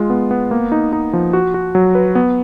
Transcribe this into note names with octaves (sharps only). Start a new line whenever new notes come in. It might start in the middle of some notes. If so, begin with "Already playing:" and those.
Already playing: G#3 F4
B3
B3
A#3
D#4
D#4
F3
F#4
F#4
F#3
B4
B3